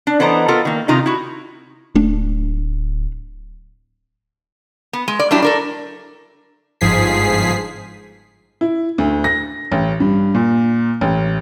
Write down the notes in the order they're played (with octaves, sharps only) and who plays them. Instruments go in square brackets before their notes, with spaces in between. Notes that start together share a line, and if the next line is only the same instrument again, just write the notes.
[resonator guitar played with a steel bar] D4
E3 B3 A4 C5 D#5 A#5
B3 F4 A4 A#4
D#3 A#3
C3 D#3 D#4 F4 A#5
E4 F#4
[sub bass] D1 [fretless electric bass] A3 D4
[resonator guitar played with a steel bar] B3
G#3
D5
F#3 G3 D4 E4
A4 A#4 D5
[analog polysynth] G1 G#2 F3 G#4 B6 C7
[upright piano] E4
D2
A#6
A1
G2
A#2
A1